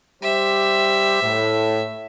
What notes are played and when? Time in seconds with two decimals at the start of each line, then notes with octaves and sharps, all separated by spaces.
0.23 G3 G4 C5 E5
1.22 A2